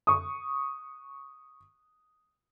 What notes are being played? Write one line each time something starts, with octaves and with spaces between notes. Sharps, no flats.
C#6 D#6